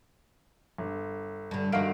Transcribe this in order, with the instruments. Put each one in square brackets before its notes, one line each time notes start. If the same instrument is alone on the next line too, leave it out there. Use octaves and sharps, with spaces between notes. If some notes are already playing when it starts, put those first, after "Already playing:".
[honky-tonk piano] G1
[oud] G2 D3
[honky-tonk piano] G1 F5 D7 [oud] D#3 F#4